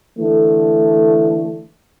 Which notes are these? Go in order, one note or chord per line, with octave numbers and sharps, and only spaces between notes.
D3 E3 A3